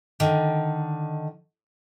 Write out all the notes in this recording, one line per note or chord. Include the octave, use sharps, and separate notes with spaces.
D3 D#3